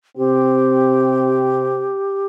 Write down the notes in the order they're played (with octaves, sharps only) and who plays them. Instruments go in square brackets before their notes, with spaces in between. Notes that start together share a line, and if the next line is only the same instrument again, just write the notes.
[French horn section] C3 C4 [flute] G4